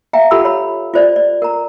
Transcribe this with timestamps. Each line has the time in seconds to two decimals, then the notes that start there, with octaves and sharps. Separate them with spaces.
0.13 E5 F5 G5 A#5
0.31 F4 G4 A4 F#5 B5 E6
0.45 C#5 B5
0.94 F4 A4 C5 D5
1.16 D5
1.42 A#4 A#5